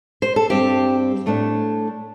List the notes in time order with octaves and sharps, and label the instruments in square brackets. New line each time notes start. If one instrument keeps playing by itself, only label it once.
[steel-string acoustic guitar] C5
A4
G2 G3 C4 G4
A2 A3 D4